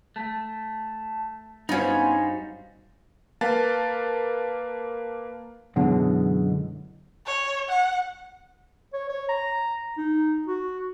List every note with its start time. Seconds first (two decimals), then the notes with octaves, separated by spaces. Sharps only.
0.16 A3 A5
1.69 G2 G3 B3 C#4 D#4 F#4 C5 F5
3.41 A#3 B4 F5 A5 A6
5.76 F#2 B2 D3 E3 G#3
7.26 C#5
7.70 F#5
8.93 C#5
9.09 C#5
9.29 A#5
9.98 D#4
10.47 F#4